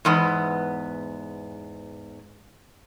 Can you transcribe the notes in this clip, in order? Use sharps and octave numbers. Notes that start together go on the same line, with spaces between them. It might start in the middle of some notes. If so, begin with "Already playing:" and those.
E2 G#2 B3